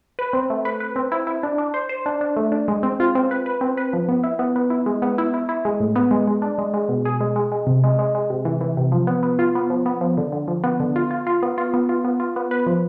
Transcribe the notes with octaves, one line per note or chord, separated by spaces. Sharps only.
B4
C4
A3
B4
B4
C4
E4
E4
D4
D4
C5
C5
D4
D4
A3
D4
G#3
C4
F4
C4
B4
B4
C4
B4
F3
B3
E4
B3
B3
E4
G#3
B3
E4
E4
E4
G#3
A2
B3
G#3
G#3
D4
G#3
G#3
B2
G#4
G#3
G#3
G#3
C3
G#3
G#3
G#3
C3
E3
E3
C3
F3
B3
B3
F4
B3
F3
B3
F3
D3
D3
F3
B3
D3
F4
F4
F4
B3
F4
B3
F4
B3
F4
B3
B4
F3